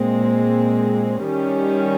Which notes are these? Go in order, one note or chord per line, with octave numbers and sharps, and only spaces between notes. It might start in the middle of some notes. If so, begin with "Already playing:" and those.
Already playing: A#2 G#3 C4
D#3 G3 C#4